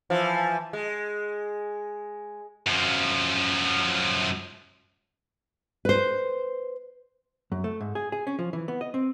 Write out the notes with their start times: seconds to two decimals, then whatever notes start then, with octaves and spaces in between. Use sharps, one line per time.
0.10 E3 F3
0.73 G#3
2.67 F#2 F3
5.85 B4 C5
7.52 F#2
7.64 A3
7.81 G#2
7.95 G#4
8.12 G#4
8.27 C#4
8.39 F3
8.53 E3
8.68 B3
8.81 D#5
8.94 C4